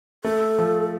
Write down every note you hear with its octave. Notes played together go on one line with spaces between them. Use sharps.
A3 A4
F3